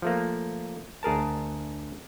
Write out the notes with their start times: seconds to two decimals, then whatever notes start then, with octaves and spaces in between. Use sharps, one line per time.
0.02 F3 A3 A#3
1.03 D2 G#4 A#4 A5